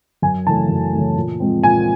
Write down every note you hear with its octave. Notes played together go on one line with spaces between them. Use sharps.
F#2 G#5
C#3 E3 A3 A5
F#2
C#3 E3 A3
A#2
F3 G#3 C4
A#2 G#5